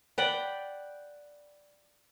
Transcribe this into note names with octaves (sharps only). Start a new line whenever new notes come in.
D5 F#5 G5 B5